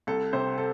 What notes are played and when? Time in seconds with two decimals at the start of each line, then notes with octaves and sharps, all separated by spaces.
0.07 C2 A4
0.33 C3 C5
0.58 A4